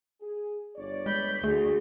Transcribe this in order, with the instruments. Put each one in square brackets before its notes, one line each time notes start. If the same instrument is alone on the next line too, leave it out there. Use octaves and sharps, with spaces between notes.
[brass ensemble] G#4
G1 C#5 D5
[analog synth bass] G#3 [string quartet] B5 G6
[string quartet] D2 [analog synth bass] A3 [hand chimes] G#4